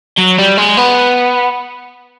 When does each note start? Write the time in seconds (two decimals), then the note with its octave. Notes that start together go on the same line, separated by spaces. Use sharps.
0.18 F#3
0.39 G3
0.58 G#3
0.77 B3